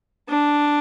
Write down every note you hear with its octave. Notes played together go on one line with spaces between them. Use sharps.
D4